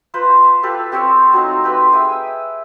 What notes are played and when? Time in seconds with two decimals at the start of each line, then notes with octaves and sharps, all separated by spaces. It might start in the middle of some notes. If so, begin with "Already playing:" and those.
0.14 F4 B4 C5 A#5
0.63 F4 G4 A4 B4
0.92 C4 G4 C5 C#5
1.33 F#3 C4 D#4 F5
1.64 G4 B4 C6
1.93 G#4 E5 G5 G#5